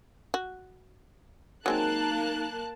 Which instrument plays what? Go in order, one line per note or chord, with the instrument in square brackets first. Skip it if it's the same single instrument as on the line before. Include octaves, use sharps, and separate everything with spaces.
[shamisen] F#4
[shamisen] F#3 G#3 C4 [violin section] A#3 A5 F#6 [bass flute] D#4